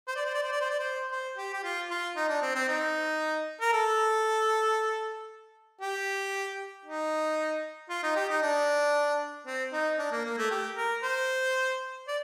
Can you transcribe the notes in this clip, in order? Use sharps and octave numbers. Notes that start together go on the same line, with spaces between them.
C5
D5
C5
D5
C5
D5
C5
D5
C5
C5
G4
G4
F4
F4
D#4
D4
C4
C4
D#4
A#4
A4
G4
D#4
F4
D#4
G4
D#4
D4
C4
D#4
D4
A#3
A#3
A3
G4
A#4
C5
D5